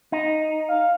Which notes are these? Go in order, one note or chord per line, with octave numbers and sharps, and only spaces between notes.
D#4
F5